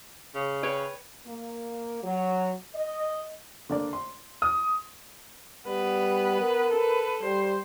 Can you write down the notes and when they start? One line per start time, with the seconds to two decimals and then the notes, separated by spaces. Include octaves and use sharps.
0.35 C#3
0.63 B4 C#5 G5
1.26 A#3
2.03 F#3
2.75 D#5
3.69 D3 A#3 D5
3.93 C6
4.42 D#6
5.67 G3 B3 B4
6.41 A#4
6.72 A4 B4
7.23 G3 C5